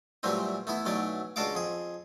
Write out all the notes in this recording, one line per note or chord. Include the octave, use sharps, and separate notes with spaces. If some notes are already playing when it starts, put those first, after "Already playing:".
A#2 E3 F#3 G3 A3 C4
A3 B3 E4
B1 E3 F#3 A3 D5
C#2 D4 F#4 A4 F5 D6
F2 G#4